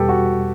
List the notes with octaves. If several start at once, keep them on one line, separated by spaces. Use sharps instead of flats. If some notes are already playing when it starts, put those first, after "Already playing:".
Already playing: E2 B2 G3 G4 A4 B4
F#4